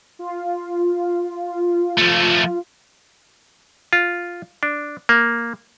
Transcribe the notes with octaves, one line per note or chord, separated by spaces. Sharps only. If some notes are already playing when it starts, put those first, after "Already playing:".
F4
F3 A3
F4
D4
A#3